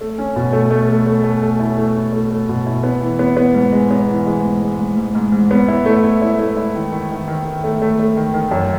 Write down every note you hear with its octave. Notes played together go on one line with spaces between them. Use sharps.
A3
C#4
B2
A3
A3
A3
A3
A3
A3
E4
A3
E4
A3
A3
B2
E4
B3
E3
B3
B3
G#2
G#3
B3
E3
G#3
G#2
G#3
G#2
G#2
G#2
G#2
B3
E4
A3
E4
E4
A3
E4
D#3
D#3
D#3
D#3
D#3
A3
A3
A3
D#3
D#3
F#2